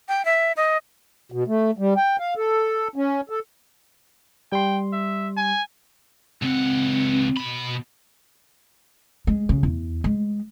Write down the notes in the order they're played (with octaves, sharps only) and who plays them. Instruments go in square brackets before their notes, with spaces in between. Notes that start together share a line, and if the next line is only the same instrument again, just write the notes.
[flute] G5
E5
D#5
[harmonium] B2
A3
G3
G5
F5
A4
C#4
A4
[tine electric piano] G3 C6 [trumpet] G5
[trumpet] E5
G#5
[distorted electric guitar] C#2 F#5 [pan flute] C4
[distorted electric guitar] B2 B5
[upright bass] G#3
C#3
E2
G#3